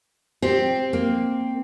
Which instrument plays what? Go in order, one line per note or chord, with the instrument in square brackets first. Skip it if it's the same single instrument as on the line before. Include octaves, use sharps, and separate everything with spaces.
[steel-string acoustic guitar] C4 [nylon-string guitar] G4
[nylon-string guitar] A#3